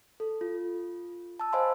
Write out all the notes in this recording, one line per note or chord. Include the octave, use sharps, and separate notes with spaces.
A4
F4
A5 E6
C5 D#5 F5 G#5 B5 C6